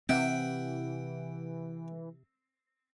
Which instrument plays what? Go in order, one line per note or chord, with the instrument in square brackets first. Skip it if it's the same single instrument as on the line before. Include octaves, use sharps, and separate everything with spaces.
[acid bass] C3 [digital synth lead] E3 [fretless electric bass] C4 [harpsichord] E5 F#5 G5